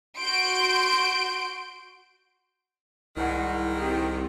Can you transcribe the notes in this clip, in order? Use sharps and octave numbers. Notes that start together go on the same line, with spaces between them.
F#4 C6 G6 D7
C2 G#2 D#3 E4 F#5
C4 G4